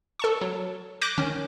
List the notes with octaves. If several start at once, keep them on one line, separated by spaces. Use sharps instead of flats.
A4 A5 C#6
F#3
D6 F#6 G6 A#6 D7
D#3 C#4